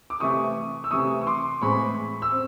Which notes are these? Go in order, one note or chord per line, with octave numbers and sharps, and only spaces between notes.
D6
C3 E3 A3 C#6 D#6
E6
C3 E3 A3 C#6 D#6
C#6
C6 D6
A2 E3 G#3 C4 B5 C#6
E6
C4